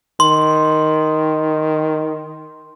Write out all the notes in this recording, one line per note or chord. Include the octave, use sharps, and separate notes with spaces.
D#3 C6